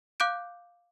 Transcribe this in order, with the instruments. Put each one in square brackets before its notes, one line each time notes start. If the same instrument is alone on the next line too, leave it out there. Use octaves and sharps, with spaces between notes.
[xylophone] F5 D6 F#6 G6 D7